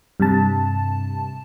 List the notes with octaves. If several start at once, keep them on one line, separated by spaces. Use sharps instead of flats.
G2 C3 A5